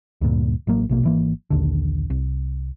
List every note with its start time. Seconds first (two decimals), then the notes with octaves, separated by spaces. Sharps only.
0.21 D2 G2 A#2
0.67 A1 F#3 A#3
0.89 A#1 B2 A#3
1.03 G#1 E3 A#3
1.50 A#1 D#2 D3
2.10 C2